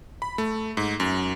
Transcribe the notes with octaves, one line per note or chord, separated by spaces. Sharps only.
B5
A3
G#2
F#2